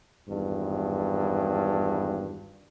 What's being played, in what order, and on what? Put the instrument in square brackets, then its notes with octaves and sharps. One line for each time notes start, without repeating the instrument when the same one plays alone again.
[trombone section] G#1 E2 G2